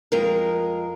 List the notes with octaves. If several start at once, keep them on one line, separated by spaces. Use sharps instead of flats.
F2 G#3 A#4